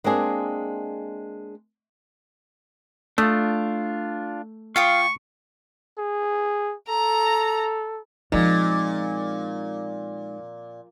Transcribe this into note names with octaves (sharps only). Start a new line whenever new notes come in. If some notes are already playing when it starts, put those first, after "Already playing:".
G#3 A#3 C4 D4 G#4
A3 D4 F4 D#6
F4 F5 G5 C#6 D#6
G#4
A4 A#5
A#2 F3 G#3 C4 D#4